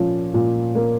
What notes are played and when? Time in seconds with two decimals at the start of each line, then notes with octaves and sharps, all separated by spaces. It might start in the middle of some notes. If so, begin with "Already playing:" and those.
Already playing: A#2 F3 C#4
0.34 A#2
0.75 A#3